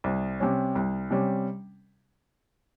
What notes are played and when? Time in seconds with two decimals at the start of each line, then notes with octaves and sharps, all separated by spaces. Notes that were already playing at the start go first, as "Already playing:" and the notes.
0.04 C2
0.40 C3 G3 C#4
0.75 C2
1.10 C3 G3 C#4